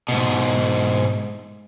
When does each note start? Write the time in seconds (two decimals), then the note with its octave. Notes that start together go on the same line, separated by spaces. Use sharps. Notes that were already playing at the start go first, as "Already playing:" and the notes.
0.08 G#2 B2